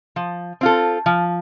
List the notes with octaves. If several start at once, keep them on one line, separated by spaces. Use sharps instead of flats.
F3
C4 F4 A4
F3